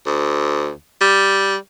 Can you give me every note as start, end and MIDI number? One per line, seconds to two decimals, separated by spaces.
0.07 0.72 38
1.01 1.56 55